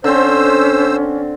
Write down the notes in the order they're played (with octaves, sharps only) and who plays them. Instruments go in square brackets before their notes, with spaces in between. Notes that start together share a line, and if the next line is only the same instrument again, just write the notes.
[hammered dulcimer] D3 C4 [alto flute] C#4 [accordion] C5 E6